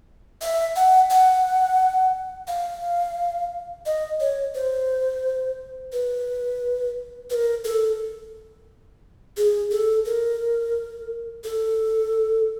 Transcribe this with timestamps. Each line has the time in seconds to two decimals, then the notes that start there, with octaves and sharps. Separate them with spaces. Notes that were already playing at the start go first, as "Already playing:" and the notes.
0.41 E5
0.76 F#5
1.10 F#5
2.48 F5
3.86 D#5
4.20 C#5
4.55 C5
5.92 B4
7.30 B4
7.34 A#4
7.65 A4
9.37 G#4
9.71 A4
10.05 A#4
11.44 A4